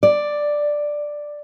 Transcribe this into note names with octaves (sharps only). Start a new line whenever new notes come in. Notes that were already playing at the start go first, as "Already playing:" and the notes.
D5